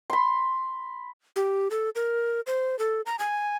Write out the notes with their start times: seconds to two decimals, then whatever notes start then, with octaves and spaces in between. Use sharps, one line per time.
0.10 B5 C6
1.36 G4
1.71 A4
1.95 A#4
2.47 C5
2.79 A4
3.06 A#5
3.19 G#5